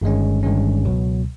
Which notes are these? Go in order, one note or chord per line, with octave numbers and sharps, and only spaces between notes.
G1 G2 D#3 G#3 C#4
G1 G2 D#3 G#3 C#4
C#2 B2 F#3